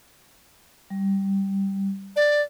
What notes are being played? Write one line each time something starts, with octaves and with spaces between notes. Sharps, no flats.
G3
D5